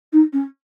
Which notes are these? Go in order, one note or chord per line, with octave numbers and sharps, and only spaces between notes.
D#4
C#4